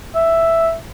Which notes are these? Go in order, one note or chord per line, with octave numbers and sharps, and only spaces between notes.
E5